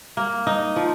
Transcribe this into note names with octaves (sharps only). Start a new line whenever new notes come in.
A#3
D#4
F3